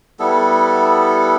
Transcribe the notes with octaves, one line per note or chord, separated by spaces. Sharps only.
G3 B3 E4 A4